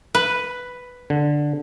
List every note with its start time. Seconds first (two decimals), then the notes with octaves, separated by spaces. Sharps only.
0.15 B4
1.10 D3